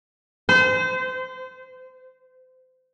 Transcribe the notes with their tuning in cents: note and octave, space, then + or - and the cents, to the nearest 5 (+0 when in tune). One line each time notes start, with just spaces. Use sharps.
C5 -30